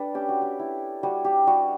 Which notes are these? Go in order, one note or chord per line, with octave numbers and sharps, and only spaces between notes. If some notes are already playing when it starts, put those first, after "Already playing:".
Already playing: G3 D4 A4 B4
C#4 G4
F#4
G4
E4
G3 F#4
G4
G3 F#4